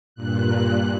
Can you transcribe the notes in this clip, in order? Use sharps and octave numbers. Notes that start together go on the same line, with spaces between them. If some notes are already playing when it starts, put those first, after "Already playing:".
G2 A#2 F#6